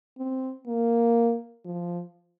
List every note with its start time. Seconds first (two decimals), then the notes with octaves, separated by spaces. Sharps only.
0.18 C4
0.67 A#3
1.65 F3